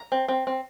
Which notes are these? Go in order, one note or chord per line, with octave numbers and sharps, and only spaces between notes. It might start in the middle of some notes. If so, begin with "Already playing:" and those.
Already playing: A#5
C4
C4
C4